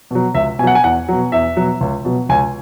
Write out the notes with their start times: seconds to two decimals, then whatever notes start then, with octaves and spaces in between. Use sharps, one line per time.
0.11 B2 F#3
0.35 C#2 E5
0.59 B2 G#5
0.63 F#3 F#5
0.75 G#5
0.83 E2 F#5
1.08 B2 F#3
1.32 E2 E5
1.57 B2 F#3
1.81 C#2
2.05 B2 F#3
2.29 C#2 G#5